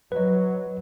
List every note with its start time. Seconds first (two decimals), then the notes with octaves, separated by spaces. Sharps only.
0.12 F#3 B4 D#5